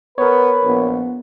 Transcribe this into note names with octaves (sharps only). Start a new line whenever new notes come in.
B3 A#4 B4 C#5
A#1 B3